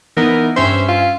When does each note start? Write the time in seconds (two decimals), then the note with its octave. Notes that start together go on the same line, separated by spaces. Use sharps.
0.17 E3 B3 D#4 A#4
0.56 G2 C#4 C5 E5
0.89 F4